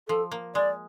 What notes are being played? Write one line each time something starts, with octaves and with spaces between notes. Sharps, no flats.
F3 A4
A#3
G#3 D5